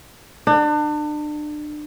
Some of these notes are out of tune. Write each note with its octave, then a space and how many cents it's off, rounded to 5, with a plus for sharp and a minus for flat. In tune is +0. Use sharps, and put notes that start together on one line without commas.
D4 +35